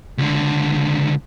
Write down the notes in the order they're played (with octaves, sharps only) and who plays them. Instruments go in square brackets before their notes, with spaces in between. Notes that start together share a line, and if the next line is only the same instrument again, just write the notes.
[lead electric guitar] C#2 D3